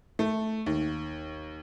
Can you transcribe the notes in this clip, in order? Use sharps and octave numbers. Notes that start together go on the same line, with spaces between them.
A3
D#2